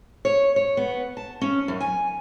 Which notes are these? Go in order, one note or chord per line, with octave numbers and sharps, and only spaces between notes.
C#5
C#5
B3
A5
C#4
F#2
G#5